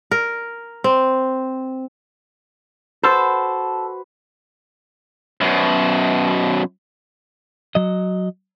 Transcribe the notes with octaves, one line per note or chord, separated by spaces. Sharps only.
A#4
C4
F#4 A4 B4 C5
F#2 B2
F#3 D#5